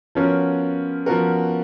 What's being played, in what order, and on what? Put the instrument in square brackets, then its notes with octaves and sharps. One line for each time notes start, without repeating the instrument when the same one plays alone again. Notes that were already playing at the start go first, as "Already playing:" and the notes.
[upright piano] F3 B3 F#4 A#4 [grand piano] C#4
[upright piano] F3 B3 F#4 A#4